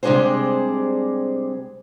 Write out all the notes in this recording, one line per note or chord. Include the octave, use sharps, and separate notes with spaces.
C3 G3 G#3 D4 G#4 C5